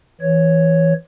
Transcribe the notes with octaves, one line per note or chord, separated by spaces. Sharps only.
E3 C#5